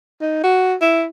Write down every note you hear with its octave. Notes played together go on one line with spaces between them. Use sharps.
D#4
F#4
E4